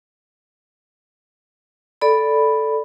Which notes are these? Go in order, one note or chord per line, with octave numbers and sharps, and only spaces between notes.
A4 D5 B5